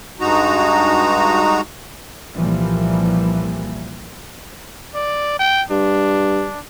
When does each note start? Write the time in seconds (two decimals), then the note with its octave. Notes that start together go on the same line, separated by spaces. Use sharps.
0.20 G2 G#3 D#4 F#4 A#5
2.33 C2 A#2 E3 F3 G3 A#3
4.94 D5
5.39 G5
5.70 G2 D4